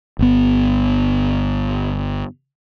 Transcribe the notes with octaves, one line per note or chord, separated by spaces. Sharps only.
G1 B3